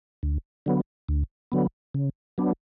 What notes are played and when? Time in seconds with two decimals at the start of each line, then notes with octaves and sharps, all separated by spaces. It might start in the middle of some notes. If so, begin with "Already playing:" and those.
0.23 D2
0.66 D3 F#3 B3
1.09 D2
1.52 D3 F#3 B3
1.95 C#3
2.38 F#3 B3 D4